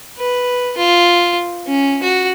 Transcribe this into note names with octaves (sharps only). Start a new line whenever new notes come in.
B4
F4
C#4
F#4